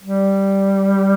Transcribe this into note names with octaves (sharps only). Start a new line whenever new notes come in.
G3